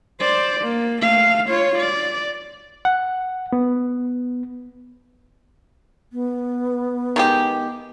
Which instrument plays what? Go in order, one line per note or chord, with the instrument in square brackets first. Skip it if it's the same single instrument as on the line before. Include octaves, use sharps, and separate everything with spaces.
[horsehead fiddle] C5 D5
A#3
A3 F5
F4 C#5
D5
[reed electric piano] F#5
B3
[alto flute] B3
[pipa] D#3 G#3 G4